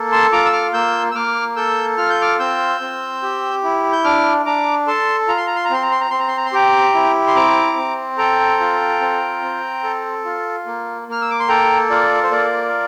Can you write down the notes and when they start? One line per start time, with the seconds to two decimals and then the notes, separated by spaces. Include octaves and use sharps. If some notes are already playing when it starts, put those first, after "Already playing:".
Already playing: A#3 A4
0.12 A5 C6
0.32 F4 A#5 D6
0.45 E6
0.53 D6 F6
0.74 A#3 E6 G6
1.11 E6
1.15 A#3 D6 F6
1.56 A4 E6 G6
1.97 F4 F6
2.10 G6
2.21 D6 F6
2.39 C4 E6 G6
2.81 C4
3.22 G4
3.63 E4
3.92 G6
4.04 D4 D6 F6
4.46 D4 A#5 D6
4.87 A4 A5 C6
5.28 F4 A#5
5.37 C6
5.47 A#5
5.55 C6
5.65 A#5
5.70 C4 C6
5.82 A#5
5.91 C6
6.01 A#5
6.10 C4 C6
6.19 A#5
6.28 C6
6.37 A#5
6.46 C6
6.53 G4 G5 A#5
6.94 E4
7.27 C6
7.35 C4 A#5 D6
7.77 C4
8.18 A4 G5 A#5
8.60 F4
9.01 C4
9.42 C4
9.84 A4
10.25 F4
10.66 A#3
11.08 A#3 F6
11.21 E6
11.30 D6
11.40 C6
11.49 A4 G5 A#5
11.90 F4 A#4 D5
12.15 A#4
12.23 C5
12.31 A#3 A#4 D5